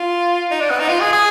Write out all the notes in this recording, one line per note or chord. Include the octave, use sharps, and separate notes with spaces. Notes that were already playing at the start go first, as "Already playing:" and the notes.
Already playing: F4
D#4
D4
B3
D#4
F4
G#4
G#4